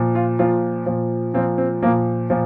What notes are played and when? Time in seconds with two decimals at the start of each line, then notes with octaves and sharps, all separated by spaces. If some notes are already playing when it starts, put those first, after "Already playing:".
Already playing: A#2 F3
0.15 F4
0.39 A#2 F3 F4
0.86 A#2 F3
1.34 A#2 F3 C4
1.58 C4
1.83 A#2 F3 A#3
2.30 A#2 F3